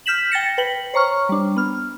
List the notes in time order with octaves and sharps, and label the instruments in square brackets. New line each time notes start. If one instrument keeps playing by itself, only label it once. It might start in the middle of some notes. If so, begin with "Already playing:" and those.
[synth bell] F6 G6 B6 E7 F#7
G5 A6 A#6 C#7
B4 G5 F#7
C5 C#5 A#5 C#6 F6
G3 D4
B3 F6